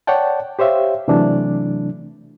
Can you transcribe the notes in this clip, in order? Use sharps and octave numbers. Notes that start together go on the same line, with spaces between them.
C#5 D5 F#5 G5 A5
G4 C5 C#5 E5 F5
C3 E3 F#3 A3 D4